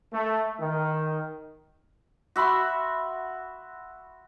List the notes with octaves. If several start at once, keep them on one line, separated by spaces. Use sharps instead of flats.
A3
D#3
F#4 E5 B5 C6